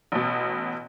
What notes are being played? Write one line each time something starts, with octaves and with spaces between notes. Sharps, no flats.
A1 B2